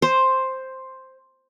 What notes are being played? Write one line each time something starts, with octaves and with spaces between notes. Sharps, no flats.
C5